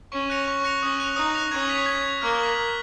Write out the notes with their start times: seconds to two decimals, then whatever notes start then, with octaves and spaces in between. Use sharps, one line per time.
0.12 C#4 C#6
0.30 F#6 A#6 C#7 F7
0.48 C#6
0.64 F#6 A#6 C#7 F7
0.82 C#4 D#6
1.00 F#6 A#6 F7
1.16 D#4 D#6
1.35 F#6 A#6 F7
1.51 C#4 G#6
1.70 B6 F7
1.86 G#6
2.04 B6 F7
2.21 A#3 F6
2.39 B6 F#7
2.56 F6